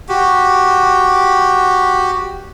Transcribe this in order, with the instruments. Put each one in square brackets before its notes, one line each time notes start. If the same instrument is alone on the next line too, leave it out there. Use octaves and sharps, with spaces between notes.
[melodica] F#4 G4